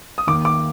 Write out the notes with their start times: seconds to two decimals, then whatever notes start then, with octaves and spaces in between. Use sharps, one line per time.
0.18 D#6
0.27 D#3 D6
0.31 D#2
0.45 D6